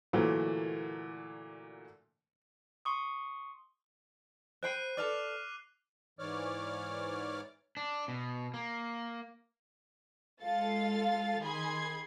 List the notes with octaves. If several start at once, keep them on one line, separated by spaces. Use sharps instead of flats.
A#2 D3 E3 F#3 A3 A#3
C6 C#6 D#6
C5 G5 B5 F#6 C7 D#7
A4 B4 D5 D6 F6 F7
G#2 E3 C#5 D5 D6 F6
D4
B2
A#3
G#3 F4 A4 F5 A6
D#3 G#4 B5 C6 G#6